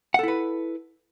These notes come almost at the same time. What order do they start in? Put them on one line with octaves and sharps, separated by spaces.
F#5 A4 E4 B4